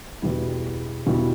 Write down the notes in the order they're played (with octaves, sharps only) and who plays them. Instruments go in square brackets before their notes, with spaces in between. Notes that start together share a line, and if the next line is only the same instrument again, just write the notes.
[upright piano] E2 B2 G3 E4
E2 B2 G3 E4